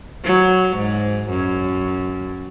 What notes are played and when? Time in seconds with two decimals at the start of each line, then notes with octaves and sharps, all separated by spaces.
0.24 F#3
0.77 G#2
1.30 F#2